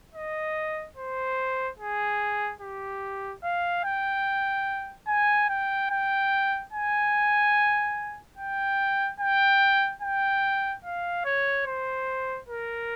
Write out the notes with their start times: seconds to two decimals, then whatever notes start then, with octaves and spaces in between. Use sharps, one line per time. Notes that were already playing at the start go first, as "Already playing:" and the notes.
0.14 D#5
0.97 C5
1.79 G#4
2.61 G4
3.44 F5
3.85 G5
5.08 G#5
5.49 G5
5.91 G5
6.73 G#5
8.38 G5
9.20 G5
10.02 G5
10.85 F5
11.25 C#5
11.66 C5
12.49 A#4